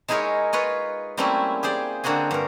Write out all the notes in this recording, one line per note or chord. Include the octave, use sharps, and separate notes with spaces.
G#3 D#4 E4 G#4 A#4 C#5
F4 B4 C#5 D#5
G3 A3 A#3 C4 C#4 E4
G4 G#4 C5 D5
D3 A#3 C4 F#4 G#4
G2 A#4